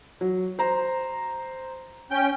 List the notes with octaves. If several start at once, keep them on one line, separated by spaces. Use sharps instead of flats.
F#3
C5 A#5
C#4 G5 G6